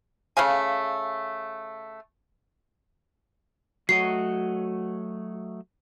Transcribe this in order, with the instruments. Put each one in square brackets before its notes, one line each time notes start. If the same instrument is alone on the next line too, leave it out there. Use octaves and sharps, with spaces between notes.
[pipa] C#3 A3 F5 G#5
[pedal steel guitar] F#3 A3 D#5 [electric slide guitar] F#4 C#5 F#5 [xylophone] C7